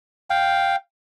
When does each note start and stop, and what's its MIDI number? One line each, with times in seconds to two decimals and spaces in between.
0.30 0.76 77
0.30 0.76 79